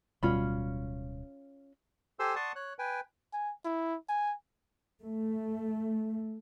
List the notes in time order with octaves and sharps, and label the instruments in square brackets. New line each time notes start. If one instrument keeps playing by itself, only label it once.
[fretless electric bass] D1 B2 G3 [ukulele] C#4 F4 B5
[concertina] G4 A4 C5 G#5 C6 E6
D5 F#5 A5 C6 C#6 D#6
C#5 F#6
B4 G5 G#5
[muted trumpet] G#5
E4
G#5
[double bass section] A3